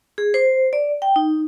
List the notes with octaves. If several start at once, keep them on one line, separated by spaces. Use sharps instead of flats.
G#4
C5
D5
G5
D#4